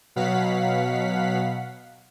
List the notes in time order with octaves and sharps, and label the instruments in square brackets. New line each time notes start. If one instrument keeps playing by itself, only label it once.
[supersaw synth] B2 F#3 F5 F#5 B6